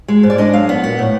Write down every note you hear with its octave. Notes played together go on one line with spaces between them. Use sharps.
G#3
G#2
D5
D4 D#5
F#3 F5
B3 F#5
A#2 F#5
A2